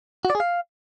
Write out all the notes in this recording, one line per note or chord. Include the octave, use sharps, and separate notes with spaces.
F#4
D5
G#4
F5